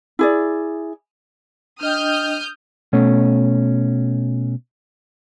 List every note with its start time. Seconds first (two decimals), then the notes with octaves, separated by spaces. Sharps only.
0.19 E4 G#4 D5
1.81 D4 D#5 G5 D#6 F6 G6
2.93 B2 A3 C#4